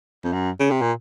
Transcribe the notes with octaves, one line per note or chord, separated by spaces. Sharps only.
F2
F#2
C#3
C3
A#2